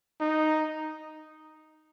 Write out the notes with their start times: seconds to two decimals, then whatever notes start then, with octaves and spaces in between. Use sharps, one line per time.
0.20 D#4